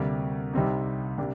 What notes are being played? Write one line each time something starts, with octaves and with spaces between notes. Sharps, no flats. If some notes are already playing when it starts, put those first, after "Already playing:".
Already playing: D2 C3 G3 A#3
C2 C3 G3 C4 D#4
C3 G3 A#3 D4